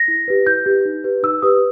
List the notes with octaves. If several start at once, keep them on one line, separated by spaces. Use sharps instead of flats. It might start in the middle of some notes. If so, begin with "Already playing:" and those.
Already playing: A#6
E4
G4 B4
E4 G6
G4 B4
D#4
G4 B4
D#4 E6
G4 B4 D#6